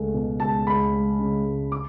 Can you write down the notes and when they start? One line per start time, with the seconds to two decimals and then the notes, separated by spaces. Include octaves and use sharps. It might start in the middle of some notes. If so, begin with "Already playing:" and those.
Already playing: C#2 A3
0.14 B2
0.40 C#2 A5
0.66 C#2 B5
0.93 G#3
1.19 C#3
1.45 C#2
1.72 D6